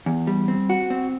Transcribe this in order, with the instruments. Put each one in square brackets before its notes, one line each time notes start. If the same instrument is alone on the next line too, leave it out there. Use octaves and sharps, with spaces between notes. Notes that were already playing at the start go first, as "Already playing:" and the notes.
[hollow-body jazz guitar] E2
G3
C4
F#4
C4